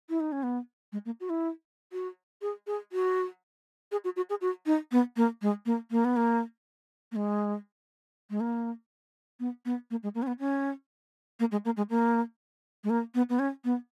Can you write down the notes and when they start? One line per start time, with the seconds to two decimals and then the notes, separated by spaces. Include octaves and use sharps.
0.09 E4
0.20 D#4
0.32 C#4
0.43 B3
0.93 G#3
1.06 A#3
1.20 F#4
1.30 E4
1.92 F#4
2.42 G#4
2.67 G#4
2.92 F#4
3.92 G#4
4.05 F#4
4.16 F#4
4.30 G#4
4.41 F#4
4.66 D#4
4.92 B3
5.17 A#3
5.42 G#3
5.66 A#3
5.91 A#3
6.05 B3
6.16 A#3
7.12 A#3
7.16 G#3
8.30 G#3
8.40 A#3
9.40 B3
9.65 B3
9.91 A#3
10.03 G#3
10.15 A#3
10.22 C#4
10.27 B3
10.39 C#4
11.40 A#3
11.52 G#3
11.65 A#3
11.77 G#3
11.90 A#3
12.84 G#3
12.90 A#3
13.15 B3
13.29 B3
13.39 C#4
13.64 B3